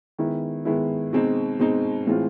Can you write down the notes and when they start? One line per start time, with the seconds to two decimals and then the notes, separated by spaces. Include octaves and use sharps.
0.19 D#3 G#3 B3 E4
0.65 D#3 G#3 B3 E4
1.13 B2 G#3 C4 D#4
1.59 B2 G#3 C4 D#4
2.07 A2 E3 G#3 C4 F4